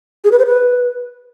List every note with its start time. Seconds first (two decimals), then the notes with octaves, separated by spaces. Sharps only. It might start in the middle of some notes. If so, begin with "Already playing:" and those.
0.24 G#4
0.32 B4
0.39 C5
0.46 B4